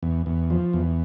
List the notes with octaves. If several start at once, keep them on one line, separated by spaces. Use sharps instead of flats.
E2
E2
F3
E2